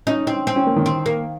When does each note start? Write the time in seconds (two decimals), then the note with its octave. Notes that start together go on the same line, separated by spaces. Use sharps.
0.07 C#4 D#4
0.27 C4 D#4
0.47 C4
0.56 C#4
0.66 A#3
0.76 D#3
0.86 C4
1.06 A#3